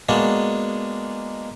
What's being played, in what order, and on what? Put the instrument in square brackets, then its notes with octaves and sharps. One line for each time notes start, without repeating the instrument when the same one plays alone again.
[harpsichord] G#3 A#3 B3 D4 F#4